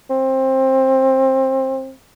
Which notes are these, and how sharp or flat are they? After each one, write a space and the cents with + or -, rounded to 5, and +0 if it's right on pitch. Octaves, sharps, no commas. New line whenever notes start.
C4 +20